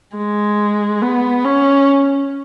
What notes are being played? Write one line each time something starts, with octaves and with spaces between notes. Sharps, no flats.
G#3
B3
C#4